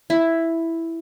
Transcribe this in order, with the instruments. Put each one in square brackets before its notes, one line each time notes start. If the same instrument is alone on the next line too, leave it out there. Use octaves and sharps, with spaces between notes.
[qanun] E4